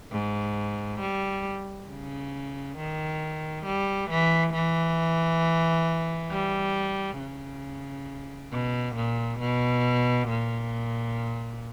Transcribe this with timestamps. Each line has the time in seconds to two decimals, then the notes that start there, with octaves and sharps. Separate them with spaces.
0.12 G#2
1.01 G3
1.89 C#3
2.78 D#3
3.66 G3
4.11 E3
4.54 E3
6.31 G3
7.19 C#3
8.52 B2
8.96 A#2
9.40 B2
10.29 A#2